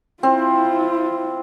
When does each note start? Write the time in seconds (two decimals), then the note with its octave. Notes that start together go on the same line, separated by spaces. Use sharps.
0.23 C4 E4 F4